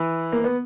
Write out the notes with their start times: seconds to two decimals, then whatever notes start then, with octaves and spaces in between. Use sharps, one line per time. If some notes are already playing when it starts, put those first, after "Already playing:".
Already playing: E3
0.32 A#3
0.44 B3